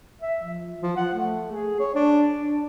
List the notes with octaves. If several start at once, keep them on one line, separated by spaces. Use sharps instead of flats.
E5
F3
F3
F#5
A3
G#4
C#5
D4
D4